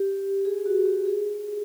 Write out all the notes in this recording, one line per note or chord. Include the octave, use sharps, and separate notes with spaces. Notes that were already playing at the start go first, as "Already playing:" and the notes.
Already playing: G4
G#4
F#4
G4
G#4